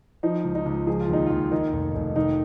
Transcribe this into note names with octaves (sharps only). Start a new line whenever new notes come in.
F3 D#4
C#2
D#4
C#2
F3 G#4
F4
D#2 D#4
D#2 F4
D#3 D#4
F1
F1
D#3 D#4